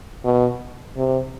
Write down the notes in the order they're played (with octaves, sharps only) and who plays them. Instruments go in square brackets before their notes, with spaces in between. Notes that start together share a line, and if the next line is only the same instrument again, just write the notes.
[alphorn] B2
C3